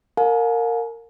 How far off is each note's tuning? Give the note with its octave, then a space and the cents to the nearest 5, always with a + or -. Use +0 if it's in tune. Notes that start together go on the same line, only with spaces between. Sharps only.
A#4 -20 F5 +40 G#5 +35